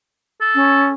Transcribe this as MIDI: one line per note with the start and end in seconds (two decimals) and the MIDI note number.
0.41 0.88 69
0.54 0.93 61